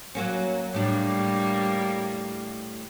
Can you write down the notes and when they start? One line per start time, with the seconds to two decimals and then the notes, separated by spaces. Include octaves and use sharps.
0.15 F#3 A#3 C#4
0.74 A2 G3 A#3 D4